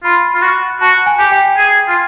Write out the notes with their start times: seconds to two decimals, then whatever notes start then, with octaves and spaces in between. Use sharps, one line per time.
0.04 F4 B5
0.35 F4
0.42 F#4
0.81 F#4 A5
1.06 G#5
1.19 G4
1.32 G5
1.57 G#4
1.88 F4